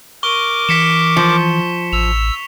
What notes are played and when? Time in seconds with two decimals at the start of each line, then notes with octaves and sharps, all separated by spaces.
0.23 A#4 C#6 D6 G7
0.69 E3 B6 C#7 E7
1.17 F3
1.93 A1 E6 F7